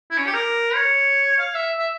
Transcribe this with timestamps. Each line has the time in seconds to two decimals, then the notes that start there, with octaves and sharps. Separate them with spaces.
0.11 E4
0.18 C#4
0.27 G4
0.34 A#4
0.75 C#5
1.39 F5
1.54 E5
1.79 E5